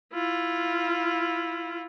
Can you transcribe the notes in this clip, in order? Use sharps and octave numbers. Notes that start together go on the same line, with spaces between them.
E4 F4